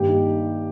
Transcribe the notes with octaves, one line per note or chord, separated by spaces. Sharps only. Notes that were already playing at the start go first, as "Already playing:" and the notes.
Already playing: G2 D#3 A#3 G4
D#4